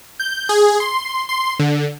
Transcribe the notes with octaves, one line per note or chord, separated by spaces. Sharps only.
G6
G#4
C6
C6
D3